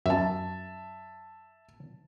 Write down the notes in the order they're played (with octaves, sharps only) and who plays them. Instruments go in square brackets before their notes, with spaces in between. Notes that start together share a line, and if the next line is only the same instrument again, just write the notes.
[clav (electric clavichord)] F#2 [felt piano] E5 A5